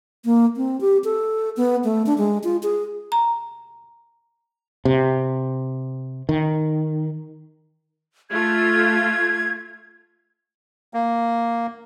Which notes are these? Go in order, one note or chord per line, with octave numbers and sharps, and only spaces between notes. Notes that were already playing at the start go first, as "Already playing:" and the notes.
A#3
C4
G4
A4
B3
A3
D4
G#3
F4
G#4
A#5
C3
D#3
A3 F4 G#6
A#3